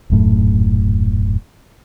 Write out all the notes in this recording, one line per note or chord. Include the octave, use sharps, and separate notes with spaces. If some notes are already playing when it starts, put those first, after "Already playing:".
D#1 F#2 A2